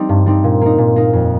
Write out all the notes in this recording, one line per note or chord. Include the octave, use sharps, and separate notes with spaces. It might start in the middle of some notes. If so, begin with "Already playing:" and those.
Already playing: G3 C4 D#4
G2
G3 C4 D#4
A#2
A#3 D#4
A#2
A#3 D#4
F2